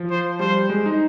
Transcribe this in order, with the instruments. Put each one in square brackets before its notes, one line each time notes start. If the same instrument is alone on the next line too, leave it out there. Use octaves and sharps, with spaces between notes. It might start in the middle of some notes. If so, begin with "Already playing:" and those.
Already playing: [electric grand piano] F3
[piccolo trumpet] C5
[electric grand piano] G3 [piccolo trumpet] C5
[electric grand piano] G#3
D#4